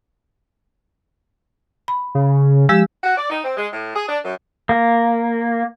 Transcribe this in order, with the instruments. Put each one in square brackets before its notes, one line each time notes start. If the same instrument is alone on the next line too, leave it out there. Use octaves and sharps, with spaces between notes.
[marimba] B5
[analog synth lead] C#3
[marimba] F3 G#3 G4 [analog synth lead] E6
[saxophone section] F#4
D5
D#4
C4
G#3
A2
G#4
D4
F#2
[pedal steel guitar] A#3